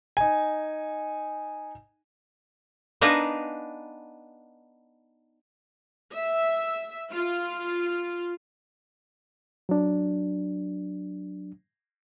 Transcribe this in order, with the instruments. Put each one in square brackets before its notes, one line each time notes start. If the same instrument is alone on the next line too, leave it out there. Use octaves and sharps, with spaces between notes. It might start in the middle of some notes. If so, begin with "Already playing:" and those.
[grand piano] D#4 G#5
[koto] B3 D4 D#4 F5 G#5 A#5
[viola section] E5
F4
[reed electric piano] F#3 D4